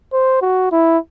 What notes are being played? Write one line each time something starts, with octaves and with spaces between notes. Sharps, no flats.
C5
F#4
E4